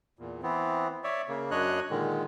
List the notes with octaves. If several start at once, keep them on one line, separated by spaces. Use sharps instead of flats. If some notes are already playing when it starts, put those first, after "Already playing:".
E2 A#2
E3 B3 C4
C#5 D5 E5
C#3 A#3
F#2 D4 C#5 D#5 F#6
A#2 D3 D#3 G#3